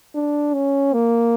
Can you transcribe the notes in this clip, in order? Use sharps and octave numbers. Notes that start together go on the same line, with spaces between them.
D4
C#4
A#3